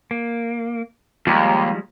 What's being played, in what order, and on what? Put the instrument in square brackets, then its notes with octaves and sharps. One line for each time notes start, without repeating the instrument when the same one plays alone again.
[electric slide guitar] A#3
[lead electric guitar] D#2 [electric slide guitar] F3 G3 G#3